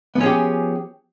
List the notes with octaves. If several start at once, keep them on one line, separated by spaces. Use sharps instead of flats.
F3 B3 C#4 G4 G#4